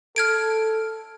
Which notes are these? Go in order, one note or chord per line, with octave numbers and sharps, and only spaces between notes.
A4 F6 G#6 D7